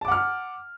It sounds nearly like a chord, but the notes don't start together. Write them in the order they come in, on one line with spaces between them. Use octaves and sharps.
A5 D6 F#5 F6